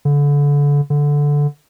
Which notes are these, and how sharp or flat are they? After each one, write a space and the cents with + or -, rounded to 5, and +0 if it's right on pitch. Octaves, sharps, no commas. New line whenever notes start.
D3 -30
D3 -10